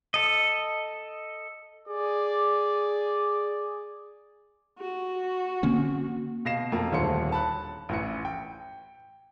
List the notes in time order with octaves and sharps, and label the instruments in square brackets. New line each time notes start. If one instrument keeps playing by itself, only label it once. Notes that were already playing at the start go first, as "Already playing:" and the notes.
[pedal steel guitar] A4 D#5
[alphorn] G#4 [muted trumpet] D5
[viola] F#4
[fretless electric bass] D3 C4 C#4 [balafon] A#3
[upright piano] B2 F5 A#6 C7 E7
F2 A#3
D#1 D2 A4 C#5 C6 C#7
A5 B5 F#6
A1 E3 C#7
G5